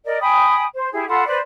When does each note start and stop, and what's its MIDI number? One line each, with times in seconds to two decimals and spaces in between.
0.05 0.17 70
0.05 0.17 74
0.05 0.17 75
0.21 0.63 79
0.21 0.63 80
0.21 0.63 83
0.21 0.63 87
0.73 0.88 72
0.92 1.04 64
0.92 1.04 67
0.92 1.04 68
1.08 1.25 65
1.08 1.25 69
1.08 1.25 78
1.08 1.25 83
1.27 1.37 71
1.27 1.37 72
1.27 1.37 74